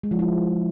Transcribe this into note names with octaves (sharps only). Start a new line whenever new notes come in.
G#3
F3
E4